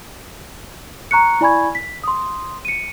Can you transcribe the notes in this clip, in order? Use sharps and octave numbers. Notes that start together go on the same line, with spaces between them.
A#5 C#6 F#6 C#7
E4 D5 G#5 B5 C#6 G#6
B6
C6 D#6
C#7 D#7